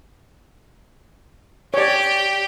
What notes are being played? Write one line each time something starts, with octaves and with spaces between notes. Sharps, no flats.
G4 C#5 D5